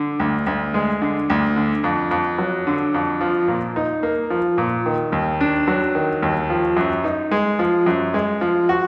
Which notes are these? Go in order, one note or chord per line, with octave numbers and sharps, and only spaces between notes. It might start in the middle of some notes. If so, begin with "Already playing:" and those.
Already playing: D3
D2
D2
G#3
D3
D2
D3
F2
F2
F#3
D3
F2
F3
A#2
D#4
A#3
F3
A#2
D#3
D#2
D4
F#3
D#3
D#2
F3
F#2
D#4
G#3
F3
F#2
G#3
F3
F#4